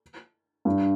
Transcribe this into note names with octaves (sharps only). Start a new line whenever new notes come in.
G2